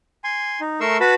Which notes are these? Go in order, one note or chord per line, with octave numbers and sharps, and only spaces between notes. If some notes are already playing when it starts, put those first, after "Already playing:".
G#5 C6
D#4
A3 A#4 C6 C#6 E6
F#4 B4 A5 B5